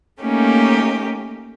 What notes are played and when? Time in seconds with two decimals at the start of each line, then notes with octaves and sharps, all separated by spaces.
0.21 A3 A#3 C#4 D#4 G4